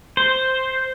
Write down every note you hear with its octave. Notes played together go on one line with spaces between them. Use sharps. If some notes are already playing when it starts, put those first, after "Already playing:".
C5